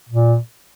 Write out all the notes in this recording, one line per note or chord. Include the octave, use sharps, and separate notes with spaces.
A#2